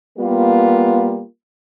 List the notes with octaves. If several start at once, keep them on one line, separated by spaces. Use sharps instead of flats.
G3 A#3 B3 F4